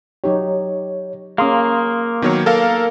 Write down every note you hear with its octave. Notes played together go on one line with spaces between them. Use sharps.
F#3 D#4 G4 C#5
A#3 C#4 G#4 F5 C6 D#6
D#3 F#3 B3 C#5
A4 A#4 F5